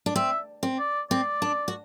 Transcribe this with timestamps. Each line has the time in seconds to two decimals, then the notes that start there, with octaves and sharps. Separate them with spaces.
0.06 D4
0.16 C4 E5
0.63 C4
0.79 D5
1.10 C4 D5
1.42 D4
1.68 F#4